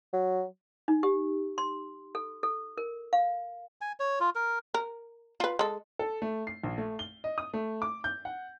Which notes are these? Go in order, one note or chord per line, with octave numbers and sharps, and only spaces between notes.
F#3
D#4
G4
C6
A4
A4
A#4
F5
G#5
C#5
F4
A#4
A#4
F4 B4
G#3 A4
A4
A3
C7
A#1
A3
G7
D#5
D#6
A3
D6
G6
F#5